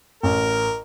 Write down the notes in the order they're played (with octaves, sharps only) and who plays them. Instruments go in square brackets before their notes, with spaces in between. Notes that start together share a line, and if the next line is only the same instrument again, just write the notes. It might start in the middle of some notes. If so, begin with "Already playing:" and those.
[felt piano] A1 [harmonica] A#4